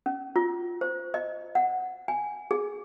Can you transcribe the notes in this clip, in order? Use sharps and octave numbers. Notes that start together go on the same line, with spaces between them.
C#4
F4
C5
D#5
F#5
G#5
G#4